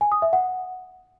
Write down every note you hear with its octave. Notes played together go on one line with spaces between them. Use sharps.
G#5
D#6
E5
F#5